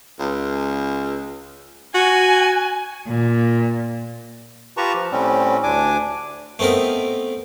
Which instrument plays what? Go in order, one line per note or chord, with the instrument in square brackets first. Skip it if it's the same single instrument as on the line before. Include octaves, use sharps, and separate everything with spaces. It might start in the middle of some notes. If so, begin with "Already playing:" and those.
[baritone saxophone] C#2
[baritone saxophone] F#4 [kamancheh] G#5
[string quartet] A#2
[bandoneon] F4 G4 B4 A5 A#5 C#6
F3
A2 G3 C4 C#4
D2 D4 G#5 D6
[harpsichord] A3 B3 C4 D#4 A#4